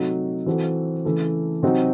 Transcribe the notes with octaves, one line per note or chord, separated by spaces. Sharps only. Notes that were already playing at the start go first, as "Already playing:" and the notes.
Already playing: C3 F#3 A3 D#4
E3 C4 F#4 A4
C#3 E3 A3
C3 F#3 C4 D#4 F#4